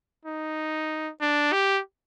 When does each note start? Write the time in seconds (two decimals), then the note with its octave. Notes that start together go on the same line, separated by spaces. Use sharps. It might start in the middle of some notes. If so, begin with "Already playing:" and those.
0.25 D#4
1.21 D4
1.52 G4